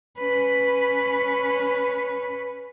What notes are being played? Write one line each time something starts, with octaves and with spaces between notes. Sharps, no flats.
C#4 B4